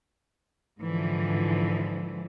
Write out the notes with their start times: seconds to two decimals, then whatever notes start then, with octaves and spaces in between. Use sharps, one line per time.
0.80 G#2 D3 E3 F3